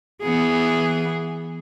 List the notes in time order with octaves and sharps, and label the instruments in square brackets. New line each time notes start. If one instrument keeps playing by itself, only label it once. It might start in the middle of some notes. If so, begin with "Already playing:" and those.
[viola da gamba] E3 B3 G#4